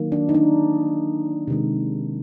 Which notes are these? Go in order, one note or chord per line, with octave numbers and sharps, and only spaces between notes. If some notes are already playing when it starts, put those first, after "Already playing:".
Already playing: D#3 F#3 A#3
D4
D#4
D4
C3 D#3 G#3